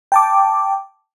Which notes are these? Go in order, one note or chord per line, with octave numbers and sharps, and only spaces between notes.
G5 A5 D6